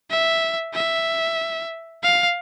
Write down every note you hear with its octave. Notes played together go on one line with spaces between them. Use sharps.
E5
E5
F5